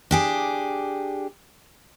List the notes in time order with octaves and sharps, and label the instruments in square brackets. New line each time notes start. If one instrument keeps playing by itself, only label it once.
[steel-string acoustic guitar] D4 G4 G#4